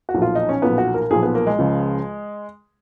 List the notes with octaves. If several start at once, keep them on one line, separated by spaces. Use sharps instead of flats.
F#4
B1 A#2 F3
F4
D#4
C#4
B1 A#2 F3 B3
F#4
A#4
B1 A#2 F3 G#4
B3
A#3
G#3
C#2 C#3 F3